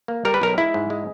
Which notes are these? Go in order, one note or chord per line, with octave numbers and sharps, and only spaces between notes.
A#3
G3 A#4
B4
B1 A#4
G#3 E4
G#2
G#3